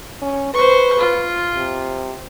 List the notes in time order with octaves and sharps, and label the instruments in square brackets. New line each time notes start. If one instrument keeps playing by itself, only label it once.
[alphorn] C#4
[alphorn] B4 [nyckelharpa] C5 C#6
[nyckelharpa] F4
[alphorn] C3